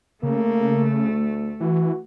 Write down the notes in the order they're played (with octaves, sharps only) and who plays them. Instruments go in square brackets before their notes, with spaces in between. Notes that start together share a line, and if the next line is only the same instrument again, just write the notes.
[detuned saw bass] C#3 [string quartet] A3 [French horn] A#3
[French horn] D2
[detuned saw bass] E3 [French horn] F#4